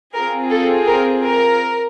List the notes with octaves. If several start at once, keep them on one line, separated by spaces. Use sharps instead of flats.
C4 F4 G#4 A#4
A4
A#4
A#4